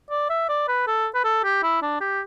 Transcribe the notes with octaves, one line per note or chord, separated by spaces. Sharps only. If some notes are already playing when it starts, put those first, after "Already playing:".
D5
E5
D5
B4
A4
B4
A4
G4
E4
D4
G4